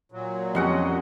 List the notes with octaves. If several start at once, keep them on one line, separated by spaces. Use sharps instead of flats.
A#2 F#3
F2 C#4 G4 D#5 F#5 C6